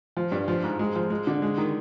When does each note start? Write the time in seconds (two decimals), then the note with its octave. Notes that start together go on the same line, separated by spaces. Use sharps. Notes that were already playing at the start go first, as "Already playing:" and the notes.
0.17 F3
0.32 G2
0.48 F3
0.63 G#2
0.79 G#3
0.96 F3
1.10 G#3
1.27 D3
1.42 G#3
1.58 D#3